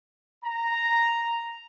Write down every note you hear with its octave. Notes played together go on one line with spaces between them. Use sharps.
A#5